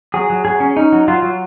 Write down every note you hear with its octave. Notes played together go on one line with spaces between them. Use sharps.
F#3 G#4
F#3
F#3 G#4
C#4
C#4 D#4
F#3
F#3 F4
F#3